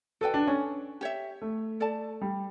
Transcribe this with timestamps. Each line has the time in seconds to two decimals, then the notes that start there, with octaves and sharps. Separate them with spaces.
0.21 F#4 A4 B4 D5 G5
0.34 D4
0.47 C#4
1.01 G4 C#5 E5
1.41 A3
1.80 A4 D5 A5
2.21 G3